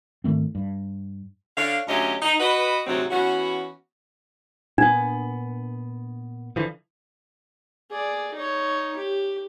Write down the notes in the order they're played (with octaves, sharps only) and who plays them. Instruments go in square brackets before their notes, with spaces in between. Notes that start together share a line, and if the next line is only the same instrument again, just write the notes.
[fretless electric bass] G#2 D#3 A3 C4
G2
[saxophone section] D3 D4 C#5 F5
D2 F#3 C#4 G4 D#5 E5
D#4
F#4 B4 D#5
D2 G#2 C3 F#3 C4 F#4
E3 B3 C#4 F#4
[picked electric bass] A#2 B3 [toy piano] D4
[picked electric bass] D3 E3 F3
[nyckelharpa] G#4 D5
D#4 C#5
G4